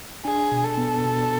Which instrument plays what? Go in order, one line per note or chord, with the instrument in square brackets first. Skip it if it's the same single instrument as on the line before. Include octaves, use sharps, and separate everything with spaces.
[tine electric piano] D4 [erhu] G#4
[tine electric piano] B2
[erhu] A4
[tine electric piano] B3
B2